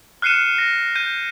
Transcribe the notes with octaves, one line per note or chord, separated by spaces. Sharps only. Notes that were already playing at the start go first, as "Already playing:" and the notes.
F6 F#6 C7 C#7 D#7 E7
A#6
G6 D#7